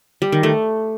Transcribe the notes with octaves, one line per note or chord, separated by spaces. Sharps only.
G3
D#3
A3